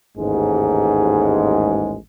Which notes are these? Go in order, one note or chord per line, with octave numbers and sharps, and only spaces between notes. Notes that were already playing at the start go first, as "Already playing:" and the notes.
A1 D#2 G#2 G#3